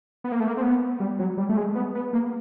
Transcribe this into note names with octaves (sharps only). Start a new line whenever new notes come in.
B3
A#3
A3
A#3
C4
B3
G3
F#3
G3
A3
G#3
B3
B3
A#3